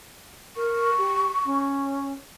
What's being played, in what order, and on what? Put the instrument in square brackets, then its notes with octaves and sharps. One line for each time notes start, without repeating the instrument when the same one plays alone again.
[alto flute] A#4 [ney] C#6
[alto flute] G4
C#4